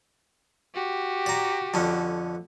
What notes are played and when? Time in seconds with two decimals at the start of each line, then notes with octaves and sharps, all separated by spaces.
0.74 F#4 G4
1.26 D5 A#5
1.74 F2 D3 C#4